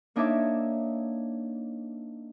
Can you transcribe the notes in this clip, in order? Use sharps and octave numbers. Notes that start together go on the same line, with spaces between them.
A#3 D4 D#4 C#5 E5 D6